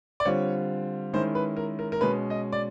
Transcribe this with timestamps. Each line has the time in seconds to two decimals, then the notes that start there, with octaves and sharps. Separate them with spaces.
0.20 D5
0.25 D3 G3 C4 F4 C#5
1.13 D#3 G#3 C#4 E4 C5
1.35 B4
1.57 A#4
1.79 A#4
1.92 A#4
2.01 B2 G#3 C#4 B4
2.30 D#5
2.52 D5